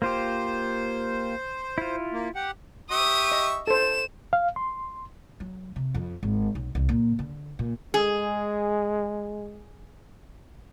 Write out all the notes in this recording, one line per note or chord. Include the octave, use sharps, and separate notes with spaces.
A#3 F4 G4 C5
E4 F4
A#3
G4 F#5
G4 E5 C#6 D#6 D#7
D#5
A4 C5 E7
F5
C6
F#3
C3
F2
G#1
B1
C2
A#2
D3
A#2
G#3 G#4